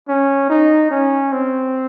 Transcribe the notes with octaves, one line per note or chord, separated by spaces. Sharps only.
C#4
D#4
C#4
C4